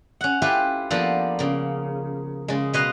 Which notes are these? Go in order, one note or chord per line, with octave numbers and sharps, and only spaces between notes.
C#4 F#5
E4 F4 G4 A4 B4 C5
F3 A#3 B3 D4 A4 C5
C#3 A#3
C#3 G#3
B2 B4 C#5 D#5 F5 C6